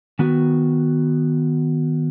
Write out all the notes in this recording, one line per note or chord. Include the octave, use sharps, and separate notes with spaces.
D#3 B3 F#4